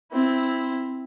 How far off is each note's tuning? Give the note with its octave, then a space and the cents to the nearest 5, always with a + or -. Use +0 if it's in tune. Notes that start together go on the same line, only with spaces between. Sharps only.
C4 +0 E4 +0